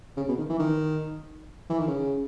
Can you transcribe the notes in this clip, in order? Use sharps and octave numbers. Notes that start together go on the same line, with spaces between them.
C#3
B2
D#3
E3
D#3
E3
D#3
C#3